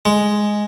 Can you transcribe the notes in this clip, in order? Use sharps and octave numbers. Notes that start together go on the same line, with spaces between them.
G#3